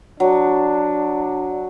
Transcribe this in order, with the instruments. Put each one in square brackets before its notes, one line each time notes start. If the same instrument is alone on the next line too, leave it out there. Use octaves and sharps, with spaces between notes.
[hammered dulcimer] F#3 [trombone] D4